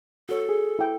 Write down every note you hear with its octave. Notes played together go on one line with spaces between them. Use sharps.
F#4 A4 C#5
G#4
E4 G5